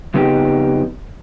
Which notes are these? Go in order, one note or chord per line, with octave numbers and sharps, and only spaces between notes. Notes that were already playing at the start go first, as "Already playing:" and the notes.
F2 C#3 B3 D#4 G4